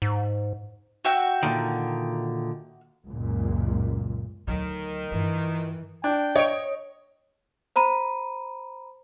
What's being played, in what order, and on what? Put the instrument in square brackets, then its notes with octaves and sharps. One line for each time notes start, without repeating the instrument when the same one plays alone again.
[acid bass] G#2
[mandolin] F#4 E5 G5
[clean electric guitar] A#2 D3 D#3
[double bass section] C#2 F#2 A#2
[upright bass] D2 F#3 [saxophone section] D#3
[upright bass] G2 F4 [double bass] E3
[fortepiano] D4 [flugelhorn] G5
[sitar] C#5 [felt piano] D#5 D7
[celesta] C5 A#5 B5 D#7